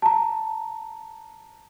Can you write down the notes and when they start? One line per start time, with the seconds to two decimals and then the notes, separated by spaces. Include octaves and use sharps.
0.02 A5 A#5